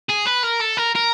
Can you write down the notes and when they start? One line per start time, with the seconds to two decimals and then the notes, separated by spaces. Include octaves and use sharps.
0.10 G#4
0.27 B4
0.44 A#4
0.61 A4
0.78 A#4
0.95 A#4